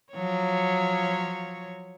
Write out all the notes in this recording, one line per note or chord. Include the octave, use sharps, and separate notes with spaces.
F3 F#3 C#5